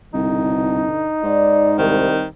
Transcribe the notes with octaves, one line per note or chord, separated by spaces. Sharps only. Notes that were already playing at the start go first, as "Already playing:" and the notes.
C2 G2 B2 D3 D#4
G#2 D5
C2 D#3 G3 C4